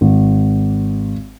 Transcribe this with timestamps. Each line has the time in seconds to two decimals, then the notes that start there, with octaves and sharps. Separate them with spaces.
0.01 G#1